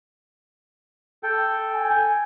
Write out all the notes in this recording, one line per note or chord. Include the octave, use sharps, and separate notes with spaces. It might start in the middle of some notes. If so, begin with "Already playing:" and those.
A4 G5
G#5